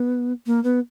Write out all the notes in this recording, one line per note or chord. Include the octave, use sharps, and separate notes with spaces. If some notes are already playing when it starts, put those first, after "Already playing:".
Already playing: B3
A#3
B3